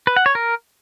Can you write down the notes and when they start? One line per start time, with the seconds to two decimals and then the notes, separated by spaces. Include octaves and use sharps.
0.07 B4
0.17 F#5
0.26 C#5
0.35 A#4